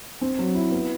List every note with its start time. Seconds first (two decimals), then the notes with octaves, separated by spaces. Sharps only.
0.21 C4
0.39 F#3
0.55 E4
0.71 B3